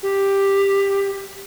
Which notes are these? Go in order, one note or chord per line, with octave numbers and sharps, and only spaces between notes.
G4